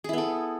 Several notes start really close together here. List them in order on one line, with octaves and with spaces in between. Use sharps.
G#4 E4 B3 A4